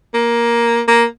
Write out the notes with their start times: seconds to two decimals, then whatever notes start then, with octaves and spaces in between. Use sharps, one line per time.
0.14 A#3
0.88 A#3